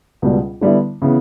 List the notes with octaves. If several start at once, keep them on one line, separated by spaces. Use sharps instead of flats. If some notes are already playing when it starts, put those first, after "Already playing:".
C#2 B2 G3
D3 G3 B3 E4
C#3 E3 B3